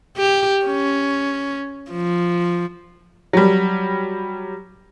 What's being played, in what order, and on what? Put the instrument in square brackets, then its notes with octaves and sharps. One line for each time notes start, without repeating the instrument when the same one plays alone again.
[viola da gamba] G4
C#4
F3
[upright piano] F#3 G3